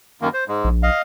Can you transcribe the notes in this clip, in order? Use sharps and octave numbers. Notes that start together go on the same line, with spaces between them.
F#2 D#3 A#3
C5
G#2 G#3
A#1
D#5 F5